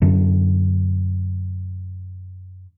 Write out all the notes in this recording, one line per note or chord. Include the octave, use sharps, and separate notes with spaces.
F#2 D3